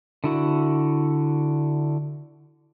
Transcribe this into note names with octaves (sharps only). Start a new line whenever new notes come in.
D3 E4 F#4